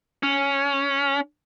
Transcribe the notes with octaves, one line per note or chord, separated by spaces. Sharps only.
C#4